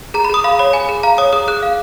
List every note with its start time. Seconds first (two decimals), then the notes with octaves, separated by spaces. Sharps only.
0.14 G#4 A#5
0.25 B5
0.30 G#4 D#6
0.44 F5 B5
0.59 C#5 B5
0.73 G#4 G#5
0.89 G#4
1.03 F5 A#5
1.18 C#5 D#6
1.33 G#4 D#6
1.48 G#4 F#6
1.63 F5